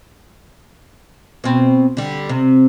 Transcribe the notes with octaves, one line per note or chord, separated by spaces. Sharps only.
B2 C4
D3 G3
C3